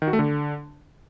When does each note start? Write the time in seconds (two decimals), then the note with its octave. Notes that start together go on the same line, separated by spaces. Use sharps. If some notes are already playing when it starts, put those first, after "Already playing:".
0.02 D#3
0.07 F#4
0.13 A3
0.19 D3